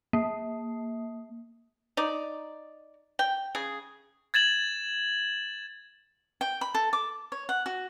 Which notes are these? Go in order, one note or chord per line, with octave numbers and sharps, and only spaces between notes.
A#3
D#4 D5
G5
C#3 G#4
G#6 A6 E7 F#7
G5
B5
A4
D6
C#5
F#5
F#4